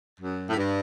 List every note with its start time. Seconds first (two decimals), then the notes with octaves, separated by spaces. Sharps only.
0.20 F#2
0.50 A2
0.57 G2